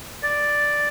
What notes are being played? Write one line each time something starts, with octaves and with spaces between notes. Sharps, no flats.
D5